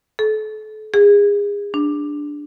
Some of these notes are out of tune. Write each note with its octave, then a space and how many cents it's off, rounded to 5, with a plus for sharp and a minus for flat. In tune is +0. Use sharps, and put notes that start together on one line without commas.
A4 -35
G#4 -30
D4 +0